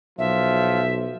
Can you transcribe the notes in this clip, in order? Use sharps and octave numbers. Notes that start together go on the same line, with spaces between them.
B1 F3 E5